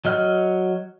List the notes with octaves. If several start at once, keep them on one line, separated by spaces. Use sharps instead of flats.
F#3 D#5 F6